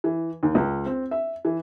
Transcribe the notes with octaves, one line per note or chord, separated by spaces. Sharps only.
E3
D#2
C#2
C4
E5
E3